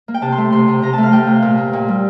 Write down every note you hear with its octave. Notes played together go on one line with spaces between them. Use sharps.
A#3
G5
C3 A5
C6
A3
C3 C6
C3
C3 A#5
A3 A5
F5
A3 G5
C3
A#2
A#3
A#2
G3